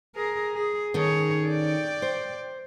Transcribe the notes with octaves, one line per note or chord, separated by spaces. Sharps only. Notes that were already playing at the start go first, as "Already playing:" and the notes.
G#4 A#4
G#4
D#3 C#4 G#4 A4 C#5
D5 G5
C5